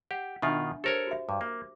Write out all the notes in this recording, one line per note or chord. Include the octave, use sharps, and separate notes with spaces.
G4 F#5
B2 D#3 D4 F4 E5 G#5
G4 A4 A#4 C5 C#5
F#4 E5
G2 D6
A#3